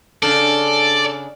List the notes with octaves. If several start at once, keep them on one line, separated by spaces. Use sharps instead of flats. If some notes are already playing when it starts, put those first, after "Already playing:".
C#3 D4 A4 D5